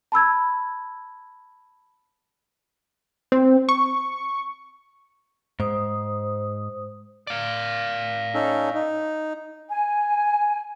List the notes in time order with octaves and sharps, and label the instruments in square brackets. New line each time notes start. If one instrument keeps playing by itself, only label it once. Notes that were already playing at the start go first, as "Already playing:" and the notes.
[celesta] A5 B5 E6 G#6
[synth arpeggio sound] C4
C#6
[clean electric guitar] G#2 [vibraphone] C5 D#6
[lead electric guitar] D5 F5
[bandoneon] C#4 D#4 A4
D#4
[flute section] G#5